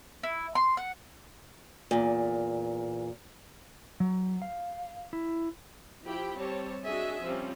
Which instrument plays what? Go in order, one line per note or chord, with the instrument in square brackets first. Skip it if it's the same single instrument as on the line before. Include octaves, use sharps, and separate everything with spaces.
[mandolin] E4
C6
F#5
[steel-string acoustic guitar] E2 A#2
[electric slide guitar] F#3
F5
E4
[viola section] F3 E4 G4 G5 B5
G3 C4 G4 C#5 A5
D4 F#4 G#4 D#5 E5 G#5
F3 G3 C4 C#4